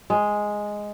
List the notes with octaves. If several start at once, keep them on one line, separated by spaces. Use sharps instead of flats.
G#3